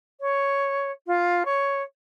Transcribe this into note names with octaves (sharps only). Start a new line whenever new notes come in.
C#5
F4
C#5